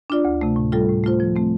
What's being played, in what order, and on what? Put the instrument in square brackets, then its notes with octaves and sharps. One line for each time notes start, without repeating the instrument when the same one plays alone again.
[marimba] D4 F4 D5
D2
C3 A3
A2
G3 F4 A4
A2
A3 F4 C5
F3
A3 C4